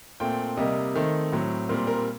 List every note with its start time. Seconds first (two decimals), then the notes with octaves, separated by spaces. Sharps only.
0.20 A#2 A3 C4 G5
0.57 C3 G3 A#3 D#5
0.95 D#3 A3 C4
1.32 A2 F#3 C4
1.69 A#2 G3 C4 A#4
1.87 A#4